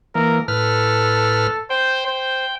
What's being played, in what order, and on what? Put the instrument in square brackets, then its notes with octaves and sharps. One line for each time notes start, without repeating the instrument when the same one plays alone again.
[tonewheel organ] E3 A#3 [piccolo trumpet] A#4
[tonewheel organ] A2 B4 F6 [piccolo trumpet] A4
[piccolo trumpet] C5 [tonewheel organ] G5
[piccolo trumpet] C5